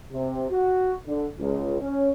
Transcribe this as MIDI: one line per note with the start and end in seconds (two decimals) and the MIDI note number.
0.11 0.43 48
0.49 0.92 66
1.06 1.27 50
1.38 1.78 37
1.80 2.11 61